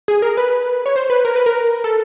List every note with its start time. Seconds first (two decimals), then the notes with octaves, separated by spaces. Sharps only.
0.08 G#4
0.22 A#4
0.37 B4
0.86 C#5
0.96 C5
1.10 B4
1.25 A#4
1.36 B4
1.46 A#4
1.84 A4